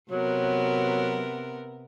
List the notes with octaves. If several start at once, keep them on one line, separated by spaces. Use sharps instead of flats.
C3 F#3 B3 A#4